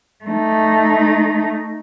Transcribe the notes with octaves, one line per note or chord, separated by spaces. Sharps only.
A3 D#4